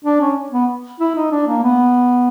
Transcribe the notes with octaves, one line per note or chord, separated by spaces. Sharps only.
D4
C#4
B3
E4
D#4
D4
A#3
B3